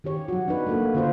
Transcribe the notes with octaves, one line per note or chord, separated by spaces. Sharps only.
D#3 G4 C#5
F#3 F#4
D4 D#4 B4
A3 A#3 F#4
D3 D4 F4 C5